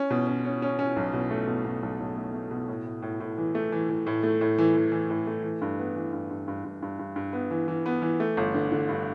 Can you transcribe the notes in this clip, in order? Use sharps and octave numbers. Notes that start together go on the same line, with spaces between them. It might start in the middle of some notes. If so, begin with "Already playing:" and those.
Already playing: C#4
B2
C#4
C#4
C#4
C#4
B1
B2
A3
B2
B2
B1
B1
A3
A3
B2
A2
A2
A2
A2
E3
A3
E3
E3
A2
A3
A2
E3
E3
E3
A2
A3
E3
G2
B3
E3
G2
G2
G2
G2
G2
G2
G2
B3
E3
E3
B3
E3
A3
G1
D3
D3
G2